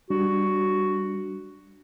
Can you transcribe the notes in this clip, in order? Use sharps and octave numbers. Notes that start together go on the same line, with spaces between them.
G3 D4 F#4